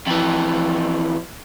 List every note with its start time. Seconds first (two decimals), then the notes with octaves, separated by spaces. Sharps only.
0.07 F2 E3